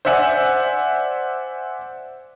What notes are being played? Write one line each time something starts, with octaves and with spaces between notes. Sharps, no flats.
C5 D5 E5 F#5 G#5